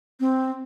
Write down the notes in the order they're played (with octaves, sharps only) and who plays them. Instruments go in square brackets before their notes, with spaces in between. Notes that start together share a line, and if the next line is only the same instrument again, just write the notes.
[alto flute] C4